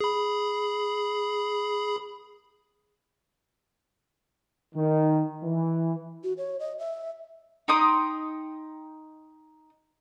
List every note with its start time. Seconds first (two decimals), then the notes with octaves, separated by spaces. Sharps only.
0.01 G#4 B5
4.75 D#3
5.43 E3
6.24 F#4
6.38 C#5
6.60 D#5
6.79 E5
7.68 D#4 G5 C6 D#6